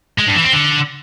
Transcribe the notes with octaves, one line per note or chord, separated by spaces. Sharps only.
G#3
G2
E3
C4
D3